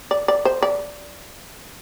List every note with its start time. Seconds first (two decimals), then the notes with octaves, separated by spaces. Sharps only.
0.11 D5
0.28 D5
0.45 C5
0.62 D5